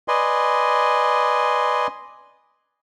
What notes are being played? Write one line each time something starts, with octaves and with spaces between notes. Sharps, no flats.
B4 D5 D#5 G#5 C6